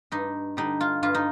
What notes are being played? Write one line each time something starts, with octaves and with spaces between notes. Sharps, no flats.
G2 D#4
D3 G3 D#4
F4
G2 F4
D#4